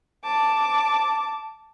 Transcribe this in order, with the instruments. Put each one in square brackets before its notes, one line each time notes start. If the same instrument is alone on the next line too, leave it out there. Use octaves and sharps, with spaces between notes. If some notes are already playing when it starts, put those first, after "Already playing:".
[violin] A5 D6